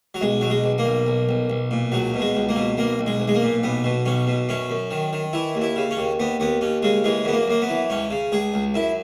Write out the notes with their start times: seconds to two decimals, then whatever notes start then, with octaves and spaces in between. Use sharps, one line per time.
0.14 F#3
0.21 B1 G#3
0.41 B1 F#3
0.50 G#3
0.64 B1
0.78 A#3
0.85 B1
1.06 B1
1.29 B1
1.50 B1
1.71 A#2
1.92 C#2 F#3
2.14 B2
2.20 G#3
2.35 C#2
2.49 A#3
2.56 B2
2.78 B1 A#3
2.99 B1
3.06 G#3
3.20 B1
3.28 G#3
3.35 A#3
3.42 A#2
3.63 B1 B3
3.84 B2
4.06 B1 C#4
4.27 B2
4.49 F#2 C#4
4.70 F#2
4.91 D#3
5.13 D#3
5.33 E3 E4
5.55 D#2
5.62 E4
5.76 C#3
5.91 C#4
5.97 D#2
6.20 D#2 B3
6.40 D#2 B3
6.61 D#2 C#4
6.82 C#3 G#3
7.04 E3 G#3
7.25 F#2 B3
7.32 A#3
7.48 F#2 A#3
7.62 B3
7.69 E3
7.90 C#2 C#4
8.11 C#3
8.32 C#2 G#4
8.54 C#2
8.74 F#2 E4